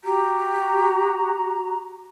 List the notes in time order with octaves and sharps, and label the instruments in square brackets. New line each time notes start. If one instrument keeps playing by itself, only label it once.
[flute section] F#4 A#5 [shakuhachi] G4